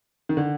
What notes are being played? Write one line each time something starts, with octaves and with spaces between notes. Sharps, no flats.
D#3
D3